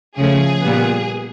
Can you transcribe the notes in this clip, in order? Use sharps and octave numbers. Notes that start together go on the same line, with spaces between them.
C#3 F3 A3 G#4
A#2 G3 B3